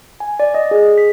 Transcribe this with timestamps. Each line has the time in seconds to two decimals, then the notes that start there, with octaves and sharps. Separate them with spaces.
0.20 G#5
0.40 D5
0.54 D#5
0.71 G#4
0.98 B6